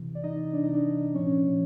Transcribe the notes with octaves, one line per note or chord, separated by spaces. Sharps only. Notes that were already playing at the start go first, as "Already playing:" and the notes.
Already playing: C3 E3
D5
C3 E3 D#4 D#5
C3 E3 D4 D5
D#4 D#5
D4 D5
C3 E3
A#2 F3 C#4 C#5
A#2 F3